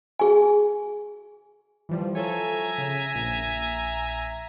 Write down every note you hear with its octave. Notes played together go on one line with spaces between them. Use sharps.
G#4 G#5
E3 F3 G3
F3 A4 C#5 E5 G#5 A#5
C#3
A#1